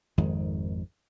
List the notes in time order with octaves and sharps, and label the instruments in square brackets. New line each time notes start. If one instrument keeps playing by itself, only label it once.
[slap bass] G#1 F2 D#3 G#3